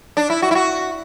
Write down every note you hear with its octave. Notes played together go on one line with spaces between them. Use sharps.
D4
E4
F#4
E4
F#4